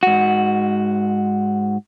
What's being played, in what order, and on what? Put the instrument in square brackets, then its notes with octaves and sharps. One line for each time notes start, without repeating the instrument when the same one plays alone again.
[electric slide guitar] G#2 F#4